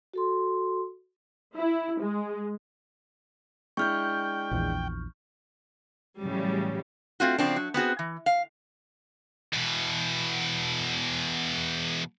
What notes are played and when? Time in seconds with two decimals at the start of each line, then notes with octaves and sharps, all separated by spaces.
0.13 F#4 A4 C6
1.56 E4
2.01 G#3
3.77 G#3 D4 E4 G5 C#6 F6 G6
4.51 A#1 E2
6.19 A2 C#3 E3 F#3 G3
7.20 A3 C4 F4 F#4
7.38 C#3 F3 C4 D4
7.56 F#3
7.74 B3 C4 F#4 G#4
7.99 E3
8.26 F5
9.53 E2 B2